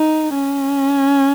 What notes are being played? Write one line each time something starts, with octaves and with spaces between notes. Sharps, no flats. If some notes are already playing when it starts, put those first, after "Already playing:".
Already playing: D#4
C#4